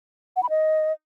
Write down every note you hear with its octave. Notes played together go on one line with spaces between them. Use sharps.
F#5
B5
D#5